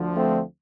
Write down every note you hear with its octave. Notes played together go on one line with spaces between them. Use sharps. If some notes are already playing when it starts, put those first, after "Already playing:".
Already playing: D2 D3 F3
A3 C4